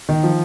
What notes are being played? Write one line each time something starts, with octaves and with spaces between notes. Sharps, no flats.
D#3
F3